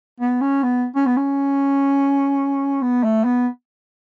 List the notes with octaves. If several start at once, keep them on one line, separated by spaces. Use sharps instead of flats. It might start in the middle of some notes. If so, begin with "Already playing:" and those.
B3
C#4
B3
C#4
B3
C#4
B3
A3
B3